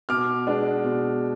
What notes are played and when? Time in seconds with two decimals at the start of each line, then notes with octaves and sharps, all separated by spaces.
0.09 B2 D6 F6
0.47 G#3 B3 D4
0.84 B2